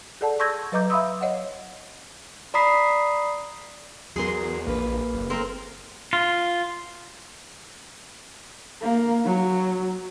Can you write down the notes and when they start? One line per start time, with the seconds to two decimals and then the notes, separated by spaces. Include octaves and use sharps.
0.21 G#4 A4 D5 F#5 A5
0.39 C6 C#6 E6 G6 G#6 A#6
0.72 F#3 B4 D#5 A#5 D6 G6
0.90 E5 F5 B5 C6 D#6 E6
1.21 C#5 D#5 F5 F#5
2.54 D5 A#5 B5 D#6 B6 C7
4.16 E2 F#3 G#4 A#4 C6
4.67 A#1 A#3 B4
5.13 F#1
5.30 C4 A#4
6.13 F4
8.82 A#3
9.25 F#3